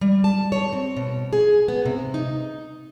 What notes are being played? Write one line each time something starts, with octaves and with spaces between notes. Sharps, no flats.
G3
A5
C#5
C4
B2
G#4
B3
C3
D#4